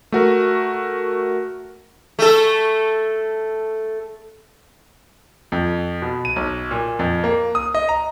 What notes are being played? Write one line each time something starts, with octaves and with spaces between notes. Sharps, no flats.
A3 F#4 A#4
A3 A4
F2
B2
D#7
B1
A#2
F2
A#3
D#6
D#5
A#5